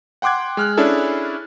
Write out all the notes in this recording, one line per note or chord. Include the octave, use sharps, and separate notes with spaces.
F#5 G5 C6 D6 F#6 G#6
G#3 F6 F#6
C#4 D4 E4 G#4 A4